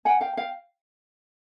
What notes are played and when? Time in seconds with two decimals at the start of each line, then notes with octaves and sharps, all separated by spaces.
0.05 F#5 G#5
0.21 F5 G5
0.37 F5 G5